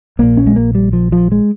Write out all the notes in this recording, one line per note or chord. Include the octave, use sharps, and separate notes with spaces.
A#1 A#2 A#3
C#4
G#3
A#3
G3
F3
F3
G#3